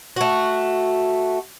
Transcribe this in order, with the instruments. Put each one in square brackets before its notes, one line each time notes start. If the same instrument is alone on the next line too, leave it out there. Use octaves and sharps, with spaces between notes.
[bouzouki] A3 F#4